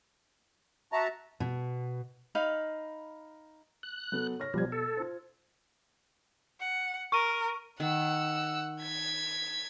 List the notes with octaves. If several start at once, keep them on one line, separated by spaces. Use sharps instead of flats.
F#4 E5 A5 A#5
B2
D#4 F5 B5
F#6
F#3 B3 A4
C#5 F6 A#6
B2 F3 G3 G#6
A4
F4 C5
F#5
A#4 C#6 D#7
D#3 F#5 E6
G#6 B6